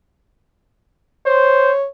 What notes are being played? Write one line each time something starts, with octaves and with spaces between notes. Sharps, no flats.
C5 C#5